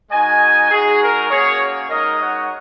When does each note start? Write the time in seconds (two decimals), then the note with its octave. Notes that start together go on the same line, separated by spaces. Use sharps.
0.11 G#3 D#4 F#4 D#5 G#5
0.71 G#3 D#4 F#4 G#4
1.01 A#4
1.30 A#3 C#4 F#4 G#4 C#5
1.90 G#3 D#4 F#4 A#4 D#5
2.20 C#5 F#5